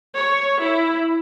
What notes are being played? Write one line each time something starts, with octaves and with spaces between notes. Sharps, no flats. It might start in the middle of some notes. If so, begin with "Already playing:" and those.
C#5
E4